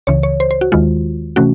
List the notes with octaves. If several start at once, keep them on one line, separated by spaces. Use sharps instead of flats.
C#2 C#3 E3 C#5
C#5
C5
C5
F#4
D#2 D#3 G#3 F4
C3 E3 A3 C#4 F#4